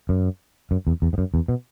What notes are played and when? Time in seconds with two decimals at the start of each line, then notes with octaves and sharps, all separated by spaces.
0.09 F#2
0.71 F#2
0.87 E2
1.02 E2
1.13 G#2
1.18 F#2
1.34 E2
1.48 B2